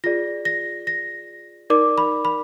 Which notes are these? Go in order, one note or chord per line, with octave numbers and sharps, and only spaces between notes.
F4 G#4 D5 A#6
A#6
A#6
D#4 A#4 D5 D6
B5
B5